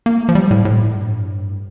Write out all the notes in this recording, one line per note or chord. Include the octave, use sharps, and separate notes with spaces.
A#3
A3
F3
G3
A2
A2
G2